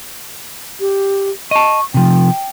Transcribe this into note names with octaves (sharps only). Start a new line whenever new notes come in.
G4
D#5 A5 C#6
C3 F3 G5